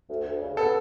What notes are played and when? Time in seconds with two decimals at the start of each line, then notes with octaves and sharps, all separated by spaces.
0.09 D2
0.26 D2
0.41 C#3
0.57 B3 A4